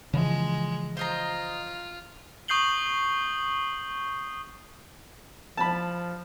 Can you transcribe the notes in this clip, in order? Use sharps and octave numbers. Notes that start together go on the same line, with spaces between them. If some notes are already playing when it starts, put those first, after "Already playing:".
C#3 E3 F3 G#3
F4 C5 D#5 A#5
C#6 D#6 G6 C7 F#7 G7
F3 A5 B5